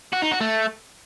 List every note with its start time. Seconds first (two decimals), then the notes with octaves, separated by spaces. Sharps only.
0.13 F#4
0.22 D#4
0.31 F#4
0.41 A3